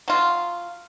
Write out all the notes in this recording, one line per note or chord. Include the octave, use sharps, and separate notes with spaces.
F#3 F4